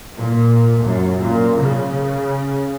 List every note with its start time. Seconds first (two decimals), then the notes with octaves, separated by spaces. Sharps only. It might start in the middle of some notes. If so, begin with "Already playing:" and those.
0.18 A#2
0.84 F#2
1.20 A#2
1.60 C#3